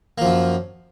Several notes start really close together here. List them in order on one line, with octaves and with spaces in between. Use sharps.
A#3 F3 F#2